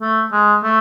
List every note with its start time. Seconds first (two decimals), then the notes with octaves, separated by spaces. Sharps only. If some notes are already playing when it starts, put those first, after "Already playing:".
0.01 A3
0.32 G#3
0.64 A3